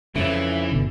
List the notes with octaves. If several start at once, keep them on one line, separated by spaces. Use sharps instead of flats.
F2 C#3 E3 E5
G1 B2 D3